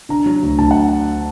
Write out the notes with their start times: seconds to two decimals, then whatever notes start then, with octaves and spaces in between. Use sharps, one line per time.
0.09 D3 A#5
0.26 F#3
0.43 D2
0.58 D2 A5
0.71 F#5